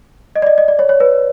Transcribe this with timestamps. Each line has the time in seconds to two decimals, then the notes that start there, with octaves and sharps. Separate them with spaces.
0.36 D#5
0.42 D5
0.47 D#5
0.58 D#5
0.68 D5
0.79 C#5
0.89 C#5
1.00 B4